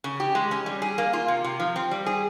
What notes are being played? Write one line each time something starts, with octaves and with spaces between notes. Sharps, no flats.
C#3
G4
G#3
C#4
G3
G#4
A#3
F4
C3
C3
F3
C4
G3
G#4